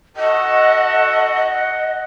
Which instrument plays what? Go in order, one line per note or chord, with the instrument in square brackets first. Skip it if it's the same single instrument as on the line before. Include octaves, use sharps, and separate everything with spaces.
[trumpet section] F#4 A4 [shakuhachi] D#5 [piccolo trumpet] F#5